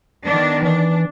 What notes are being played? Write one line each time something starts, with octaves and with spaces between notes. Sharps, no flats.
D#3 B3 D4
E3 D4